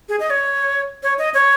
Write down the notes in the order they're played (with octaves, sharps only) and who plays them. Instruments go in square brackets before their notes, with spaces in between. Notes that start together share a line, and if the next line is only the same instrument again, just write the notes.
[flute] G#4
D#5
C#5
C#5
D#5
C#5